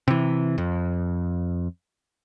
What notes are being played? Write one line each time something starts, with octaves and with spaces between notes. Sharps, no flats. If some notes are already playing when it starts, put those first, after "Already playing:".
C3 E3
F2